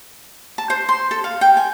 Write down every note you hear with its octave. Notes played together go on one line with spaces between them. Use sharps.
A5
C5
C6
A4
F5
G5
G#5